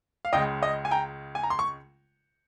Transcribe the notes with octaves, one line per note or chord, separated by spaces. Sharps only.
F5
C#2 C#3 G#3 D#5 G5
D#5
G#5
G5 A#5
G#5
A#5
C6
C#6